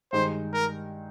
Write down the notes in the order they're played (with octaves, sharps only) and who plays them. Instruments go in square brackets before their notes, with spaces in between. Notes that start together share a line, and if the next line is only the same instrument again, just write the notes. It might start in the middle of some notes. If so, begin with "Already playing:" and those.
[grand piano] G2 D#3 G#3 D#4 [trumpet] C5
[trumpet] A#4